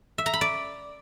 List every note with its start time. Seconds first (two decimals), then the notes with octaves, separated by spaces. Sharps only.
0.18 E5
0.26 A#5
0.34 B5
0.41 D5